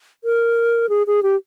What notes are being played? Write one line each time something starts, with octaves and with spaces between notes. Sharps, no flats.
A#4
G#4
G#4
G4